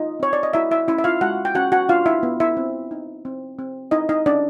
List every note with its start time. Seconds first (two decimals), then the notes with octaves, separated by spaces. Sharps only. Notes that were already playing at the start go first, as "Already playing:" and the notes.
Already playing: D#4 F4 D#5
0.20 C4 C#5
0.33 D5
0.43 D#5
0.53 E4 F#4 E5
0.71 E4 E5
0.88 C#4 E4 E5
0.98 E5
1.04 F4 F5
1.21 G#3 F#4 F#5
1.45 G5
1.55 C#4 F#4 F#5
1.72 F#4 F#5
1.89 D4 F4 F5
2.06 E4 E5
2.23 B3
2.40 E4 E5
2.57 C4
2.91 D#4
3.25 C4
3.59 C4
3.91 D#4 E4 D#5
4.09 D#4 D#5
4.26 C#4 D4 D5